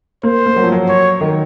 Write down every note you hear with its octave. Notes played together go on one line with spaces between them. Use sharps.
A#3 C5
A#3
F#3
F3
F#3
C#5
D#3